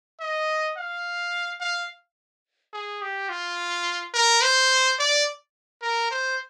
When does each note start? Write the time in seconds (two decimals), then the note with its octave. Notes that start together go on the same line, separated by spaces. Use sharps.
0.20 D#5
0.77 F5
1.61 F5
2.73 G#4
3.02 G4
3.30 F4
4.14 A#4
4.42 C5
4.99 D5
5.82 A#4
6.11 C5